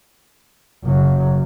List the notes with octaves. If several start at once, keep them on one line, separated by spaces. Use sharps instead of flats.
F#1 F#3